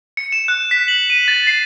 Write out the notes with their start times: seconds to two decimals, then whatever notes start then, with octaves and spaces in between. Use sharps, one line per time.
0.17 C#7
0.32 E7
0.48 F#6
0.71 B6
0.88 F#7
1.10 D#7
1.28 A6
1.47 C7